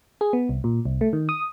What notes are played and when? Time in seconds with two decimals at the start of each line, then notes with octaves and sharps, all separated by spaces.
0.21 G#4
0.33 B3
0.49 C2
0.64 A#2
0.85 C2
1.01 A3
1.13 D#3
1.29 D#6